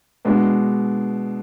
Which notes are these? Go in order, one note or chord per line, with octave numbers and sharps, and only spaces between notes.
B2 G#3 D4